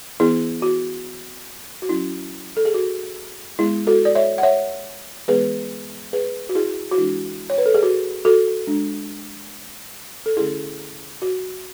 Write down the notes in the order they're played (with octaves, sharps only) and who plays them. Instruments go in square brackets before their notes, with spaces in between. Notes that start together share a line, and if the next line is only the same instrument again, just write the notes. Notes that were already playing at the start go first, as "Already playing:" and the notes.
[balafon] E3 B3 E4 G#4
F#4
F#4
F#3 C#4 E4
A4
G#4
F#4
G#3 B3 E4 G#4
F#4 A4
D5
C#5 E5
F#5
C#5 E5
E3 G#3 B3 G#4 B4
G#4 B4
F#4
E4 G#4
F#4
E3 G#3 D4 E4
C#5
B4
A4
G#4
F#4
F#4 A4
G#3 D4
A4
D3 A3 C#4 E4 G#4
F#4